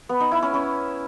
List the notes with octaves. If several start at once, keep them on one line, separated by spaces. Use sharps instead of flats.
B3
D#4
E4
C#4
C#4